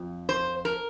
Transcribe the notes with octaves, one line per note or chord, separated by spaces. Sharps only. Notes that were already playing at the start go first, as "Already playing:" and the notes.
Already playing: F2 F3
C5
A#4